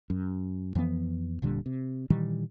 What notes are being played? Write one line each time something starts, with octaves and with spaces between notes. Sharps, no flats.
F#2
F2 E3 F3 B3
F1 A#2 D3 G3
C3
A#2 D#3 E3 G3